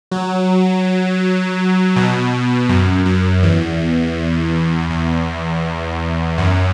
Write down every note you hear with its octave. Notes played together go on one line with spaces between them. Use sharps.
F#3
B2
F#2
F#2
E2
E2
F#2